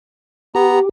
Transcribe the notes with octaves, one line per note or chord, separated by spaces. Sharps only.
B3 G4 A#5